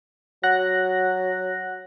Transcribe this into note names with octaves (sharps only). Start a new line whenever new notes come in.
F#3 F#5 F#6 A#6